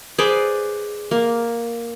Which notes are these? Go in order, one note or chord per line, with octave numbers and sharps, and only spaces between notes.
G#4 B4 C5 D5
A#3